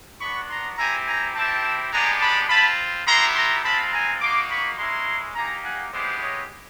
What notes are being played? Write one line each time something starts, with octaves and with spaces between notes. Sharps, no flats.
B3 D4 F#4 B5 C#6
A#5 C6
C4 E4 G4 G#5 A#5
G#5 A#5
C4 E4 G4 G5 A5
G#3 B3 D4 G4 G#5 A#5
A5 B5
C4 F4 A5 B5
B3 E4 G4 A#5 C6
A#5 C6
G#3 C4 F4 A5 B5
G#5 A#5
A#3 D#4 F#4 C6 D6
B5 C#6
G#3 C#4 E4 A#5 C6
A#3 D#4 G4 G#5 A#5
F#5 G#5
G#3 B3 E4 G4 C5 D5
C#5 D#5